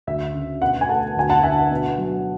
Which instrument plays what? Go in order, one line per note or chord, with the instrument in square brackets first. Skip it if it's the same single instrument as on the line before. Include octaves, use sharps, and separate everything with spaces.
[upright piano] D2 E5
C#3
B2 F#5
G#5
A3 F#5 A5
D2 G#5
F#5 A5
D3 E5 G#5
F#5
B2
F#3